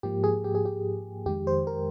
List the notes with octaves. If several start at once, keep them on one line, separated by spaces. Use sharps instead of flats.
G#2 F3 A#3 G4
G#4
G4
G#4
G4
F2 D#3 G#3 G4
C5
A#4